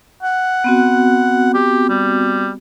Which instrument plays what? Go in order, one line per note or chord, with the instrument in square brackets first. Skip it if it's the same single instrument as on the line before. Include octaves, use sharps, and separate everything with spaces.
[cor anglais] F#5
[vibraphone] B3 C4 F#4
[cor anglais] G4
G3